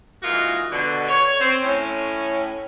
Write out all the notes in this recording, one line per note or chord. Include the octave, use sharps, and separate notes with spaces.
G#2 E3 A#3 F4 F#4 D#5
B2 D3
C#5
C4
A2 C#4